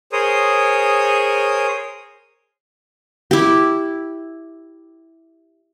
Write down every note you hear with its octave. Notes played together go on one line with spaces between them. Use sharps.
G#4 A#4 C5 C#5 D#6
E4 G4